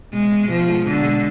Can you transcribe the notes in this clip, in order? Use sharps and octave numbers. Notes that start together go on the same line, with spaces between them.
B2 G#3
B2
B2 F3
G#3
B2 D3
G#3